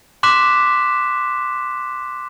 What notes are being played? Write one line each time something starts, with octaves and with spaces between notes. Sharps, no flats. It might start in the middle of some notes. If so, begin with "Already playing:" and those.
C6 D6 F#6 B6 E7